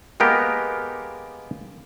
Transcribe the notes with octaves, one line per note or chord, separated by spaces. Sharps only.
G#3 A#3 B3 G4 A#4